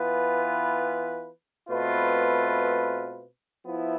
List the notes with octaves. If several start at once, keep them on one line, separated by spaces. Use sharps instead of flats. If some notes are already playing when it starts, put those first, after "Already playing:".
Already playing: E3 B3 F4 B4
B2 A3 C4 F4 B4
F3 B3 E4